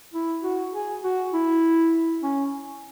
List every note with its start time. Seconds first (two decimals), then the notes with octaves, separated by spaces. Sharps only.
0.14 E4
0.43 F#4
0.73 G#4
1.03 F#4
1.33 E4
2.23 C#4